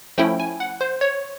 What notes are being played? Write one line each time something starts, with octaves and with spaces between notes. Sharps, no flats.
F3 A3 C#4 E4 G5
G#5
F#5
C5
C#5